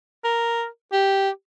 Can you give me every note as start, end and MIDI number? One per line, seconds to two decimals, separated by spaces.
0.24 0.65 70
0.92 1.30 67